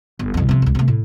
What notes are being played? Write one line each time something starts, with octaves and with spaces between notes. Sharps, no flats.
G1
C2 F2
C3 F3
D#1 C#2
C3 A3
A2